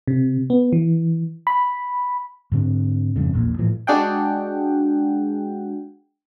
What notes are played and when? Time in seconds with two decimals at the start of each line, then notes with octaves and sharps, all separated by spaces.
0.08 C3
0.50 B3
0.73 E3
1.47 B5
2.52 G#2 D3 C4
3.16 F2 G#2 C#3
3.34 A#1 E2 A#2
3.58 A2 E3 F3
3.87 G#3 D4 F#4 G#4 F#5 G5